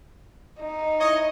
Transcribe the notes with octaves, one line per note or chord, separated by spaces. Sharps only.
D#4
E4 C#5 D#5